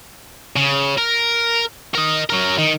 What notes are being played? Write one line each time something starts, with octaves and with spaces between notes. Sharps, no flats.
C#3
A#4
A#4 D#5
F#3 A#4
D#3